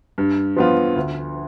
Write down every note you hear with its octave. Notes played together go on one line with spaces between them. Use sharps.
G2
F3 B3 F4
D2